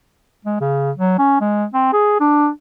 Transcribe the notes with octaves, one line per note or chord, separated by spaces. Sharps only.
G#3
C#3
F#3
C#4
G#3
C4
G#4
D4